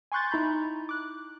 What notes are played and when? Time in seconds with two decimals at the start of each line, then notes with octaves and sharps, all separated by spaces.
0.12 G#5 C6 C#6 F#6 G6 A6
0.31 D#4 E4 A#5 B5 G6
0.89 D6 F#6